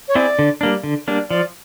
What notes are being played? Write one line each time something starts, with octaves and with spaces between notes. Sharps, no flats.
C#5
C4 E4 G#4 D5
D3
G3 A#3 D4
D3
G3 A#3 D4
F3 D5